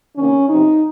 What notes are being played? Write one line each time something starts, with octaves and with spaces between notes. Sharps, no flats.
C3 D#3 A#3 C#4
C3 F3 C4 D#4